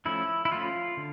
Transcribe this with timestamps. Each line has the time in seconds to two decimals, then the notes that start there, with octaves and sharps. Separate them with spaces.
0.05 F3 A3 C#4 E4
0.45 E4
0.52 F3 A3 C#4 F4
0.97 D3